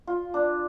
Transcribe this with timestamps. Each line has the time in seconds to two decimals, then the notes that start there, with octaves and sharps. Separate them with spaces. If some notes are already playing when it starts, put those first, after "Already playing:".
0.07 F4
0.34 D4